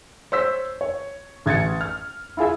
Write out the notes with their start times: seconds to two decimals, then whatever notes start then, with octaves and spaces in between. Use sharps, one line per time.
0.32 C5 C#5 E6 B6
0.81 C#5
1.46 A1 G#6 A6 C#7
1.81 F6
2.37 E4 F4 G#4 E5